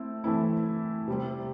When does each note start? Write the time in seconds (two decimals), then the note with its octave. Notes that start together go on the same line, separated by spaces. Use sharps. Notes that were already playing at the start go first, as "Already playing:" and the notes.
Already playing: A3 C4 E4
0.24 E3 A3 C4 E4
1.08 C3 G3 C4